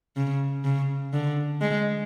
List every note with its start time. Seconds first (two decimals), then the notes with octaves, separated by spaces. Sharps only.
0.17 C#3
0.65 C#3
1.13 D3
1.61 G#3